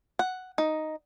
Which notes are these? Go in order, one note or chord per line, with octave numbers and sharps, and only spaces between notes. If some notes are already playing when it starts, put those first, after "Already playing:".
F#5
D#4